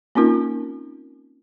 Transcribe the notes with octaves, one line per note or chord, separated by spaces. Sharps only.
A#3 C4 C#4 D#4 F4 A#4